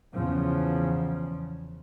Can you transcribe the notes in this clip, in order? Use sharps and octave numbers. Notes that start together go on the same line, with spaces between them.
E2 C#3 F3